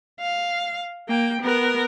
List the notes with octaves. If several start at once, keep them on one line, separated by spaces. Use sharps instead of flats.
F5
A#3 G5
B3 A#4